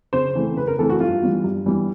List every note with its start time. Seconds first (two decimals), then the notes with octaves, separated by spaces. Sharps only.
0.13 C#3 C5
0.35 E3 A3 C4
0.57 C#3 B4
0.67 A#4
0.79 E3 A3 C4 A4
0.90 F#4
1.00 G2 F4
1.23 E3 G3 B3
1.44 G2
1.66 E3 G3 B3